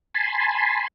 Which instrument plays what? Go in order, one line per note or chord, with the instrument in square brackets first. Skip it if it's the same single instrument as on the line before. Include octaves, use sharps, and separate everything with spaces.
[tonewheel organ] G#5 A5 B5 C6